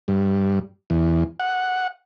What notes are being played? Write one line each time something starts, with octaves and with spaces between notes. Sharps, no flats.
G2
E2
F#5